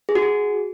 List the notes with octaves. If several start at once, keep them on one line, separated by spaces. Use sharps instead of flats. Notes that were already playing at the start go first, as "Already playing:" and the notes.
G#4
F#4
G#4